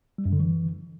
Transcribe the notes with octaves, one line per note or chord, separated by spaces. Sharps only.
G3
F#2
D3
E3